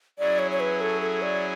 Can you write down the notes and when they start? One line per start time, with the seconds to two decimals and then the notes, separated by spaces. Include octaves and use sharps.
0.19 F#3 C#4 E4 G#4 D5
0.39 C#5
0.51 C#5
0.60 B4
0.81 A4
1.02 A4
1.22 D5